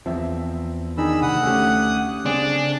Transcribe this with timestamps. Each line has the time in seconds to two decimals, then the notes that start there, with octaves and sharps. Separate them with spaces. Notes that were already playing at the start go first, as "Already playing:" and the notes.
0.06 E2 F3 C4 E5
0.98 D#3 D4 D#4 G#4 B5 E6
1.22 D2 C3 F#5 D#6
1.43 D2 A3 C#4 G4
2.26 C#3 C4 D4 G#4